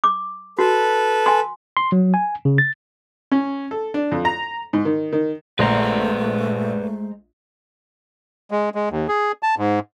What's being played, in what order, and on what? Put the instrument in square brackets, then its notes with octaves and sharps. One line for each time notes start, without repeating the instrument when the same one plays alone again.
[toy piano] D6
[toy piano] F#4 [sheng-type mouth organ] A4 B4
[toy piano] G#5 C6
[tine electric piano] C6
F#3
G#5
C#3
A6
[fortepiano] C#4
A4
D4
F2
A#5
G#2
D#3
D#3
[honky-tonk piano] A#1 [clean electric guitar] G#3 C5 A#5 [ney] A3 [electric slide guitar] B4 D5 F#5
[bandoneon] G#3
G#3
D#2
G#4
A5
G#2